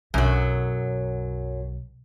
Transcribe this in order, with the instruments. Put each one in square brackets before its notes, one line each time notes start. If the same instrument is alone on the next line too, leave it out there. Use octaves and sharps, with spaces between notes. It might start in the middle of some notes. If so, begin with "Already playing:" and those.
[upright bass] B1 [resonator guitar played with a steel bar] F#2 F#3